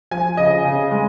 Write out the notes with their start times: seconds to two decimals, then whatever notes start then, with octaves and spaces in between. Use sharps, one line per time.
0.11 F3 G#5
0.37 C#3 D#5
0.64 C#3
0.91 G#3